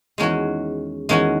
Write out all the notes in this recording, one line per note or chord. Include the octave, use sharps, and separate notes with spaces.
E2 D#3 G#3 C#4 F#4
E2 D#3 G#3 C#4 F#4